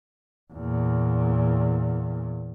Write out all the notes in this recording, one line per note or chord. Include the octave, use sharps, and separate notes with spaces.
E2 A#2